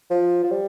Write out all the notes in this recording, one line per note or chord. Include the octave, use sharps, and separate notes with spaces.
F3
F3
G3